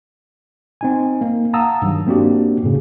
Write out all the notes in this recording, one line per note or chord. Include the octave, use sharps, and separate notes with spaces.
C4 D#4 G#5
A#3
F5 F#5 A5 A#5 D#6 E6
G2 D#3 F#3
A#3 C4 D4 F#4 G4
F#2 A2 C#3